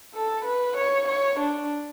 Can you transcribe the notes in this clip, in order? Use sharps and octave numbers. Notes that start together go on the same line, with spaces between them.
A4
B4
C#5
C#5
D4